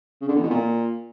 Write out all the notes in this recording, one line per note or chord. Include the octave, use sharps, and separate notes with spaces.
C#3
D3
E2
B2
A#2